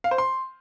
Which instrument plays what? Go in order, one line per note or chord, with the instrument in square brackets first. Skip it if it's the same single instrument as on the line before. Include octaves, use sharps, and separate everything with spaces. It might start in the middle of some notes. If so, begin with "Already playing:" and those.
[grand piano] F5
C5
C6